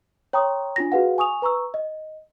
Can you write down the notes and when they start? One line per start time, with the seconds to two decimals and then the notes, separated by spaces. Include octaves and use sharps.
0.33 C#5 G5 A#5 C6 C#6 D#6
0.76 D4 F4 A#6
0.92 F#4 G#4 B4 F5 F#5
1.18 G#5 C#6 D#6 F7
1.42 B4 A#5 C#6 E6
1.74 D#5